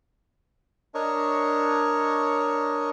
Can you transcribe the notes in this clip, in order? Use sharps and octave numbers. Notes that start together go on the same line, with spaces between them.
D4 A#4 C#5 D#5 C#6